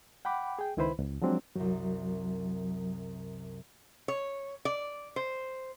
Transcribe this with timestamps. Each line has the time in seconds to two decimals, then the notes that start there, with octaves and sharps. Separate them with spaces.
0.25 F#5 G5 B5 D6
0.59 G#4 G5
0.77 C#2 D#3 E4 B4 C5 B5
0.98 C#2
1.22 F3 F#3 G#3 C4 D4
1.56 C2 F#2 F#3
4.08 C#5
4.65 D5
5.16 C5